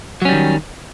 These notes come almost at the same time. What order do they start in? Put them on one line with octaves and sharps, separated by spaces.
F#3 C#4 G3 D#3